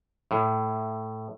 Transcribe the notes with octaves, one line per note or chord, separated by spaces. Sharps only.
A2